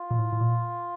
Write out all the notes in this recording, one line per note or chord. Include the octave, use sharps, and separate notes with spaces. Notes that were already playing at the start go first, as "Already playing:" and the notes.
Already playing: F4
A#2
A2
A2
A#2